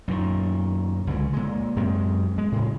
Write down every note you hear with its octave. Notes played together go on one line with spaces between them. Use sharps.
F#2 A#2 D#3
C#2 D3 G3 G#3
A#2 G#3
F#2 G#3 C4
G#3
A2 C#3